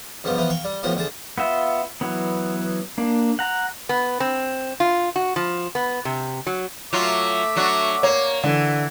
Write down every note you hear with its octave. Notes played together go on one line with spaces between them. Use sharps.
C#2 G2 F3 B3
E3 F3 B3
F5 G5 C#6
G3
A2 F3 B3 F#4
D2 G#4 A5
B3 F4 E5
E3 F#3 B3
A#3 D4
F#5 A#5
B3
C4
F4
F#4
F3
B3
C3
F#3
F#3 A3 F4 E5 D6
F#3 D4 F#4
A#3 C#5
D3 E3